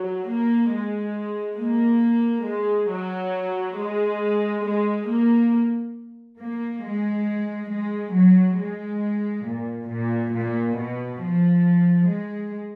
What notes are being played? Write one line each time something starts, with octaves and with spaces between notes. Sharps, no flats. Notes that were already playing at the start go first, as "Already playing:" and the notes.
Already playing: F#3
A#3
G#3
A#3
G#3
F#3
G#3
G#3
A#3
A#3
G#3
G#3
F#3
G#3
A#2
A#2
A#2
B2
F3
G#3